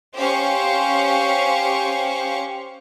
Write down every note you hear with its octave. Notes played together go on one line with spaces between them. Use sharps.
C#4 G4 C5 F5 C#6